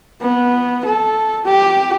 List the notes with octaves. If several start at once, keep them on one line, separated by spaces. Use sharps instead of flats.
B3
A4
G4